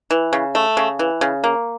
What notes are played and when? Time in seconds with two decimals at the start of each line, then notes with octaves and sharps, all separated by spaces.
0.11 E3
0.33 C#3
0.55 A3
0.77 C#3
0.99 E3
1.21 C#3
1.44 A#3